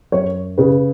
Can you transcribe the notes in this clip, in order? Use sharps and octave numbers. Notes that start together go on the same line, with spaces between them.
F#2 C#5
C#3 B4